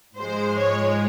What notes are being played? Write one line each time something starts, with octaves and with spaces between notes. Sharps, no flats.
G#2 F3 G#3 C5
C#5